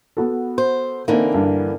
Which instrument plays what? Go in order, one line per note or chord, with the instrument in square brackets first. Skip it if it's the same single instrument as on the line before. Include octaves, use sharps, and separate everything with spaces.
[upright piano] B3 F#4 A4
[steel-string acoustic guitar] C5
[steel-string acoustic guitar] D3 E3 A#3 [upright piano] C4 D#4
[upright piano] G2